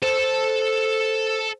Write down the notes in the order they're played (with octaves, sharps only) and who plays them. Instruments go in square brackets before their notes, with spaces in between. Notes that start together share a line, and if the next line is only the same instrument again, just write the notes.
[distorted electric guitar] A4 A5 [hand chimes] C5